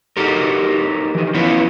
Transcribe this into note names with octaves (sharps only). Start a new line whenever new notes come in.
D#4 F#4 G4 A4 A#4
D#3 E3
F3 B3 C#4 E4 F4 B4